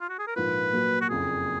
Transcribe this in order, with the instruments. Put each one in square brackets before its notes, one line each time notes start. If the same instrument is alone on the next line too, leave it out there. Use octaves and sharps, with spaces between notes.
[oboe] F4
F#4
G#4
A#4
[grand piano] A#1 G#2 F3 A#3 F4 [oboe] B4
[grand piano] A#2 F#3 A#3
[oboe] F#4
[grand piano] F#1 F2 C#3 [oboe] G#4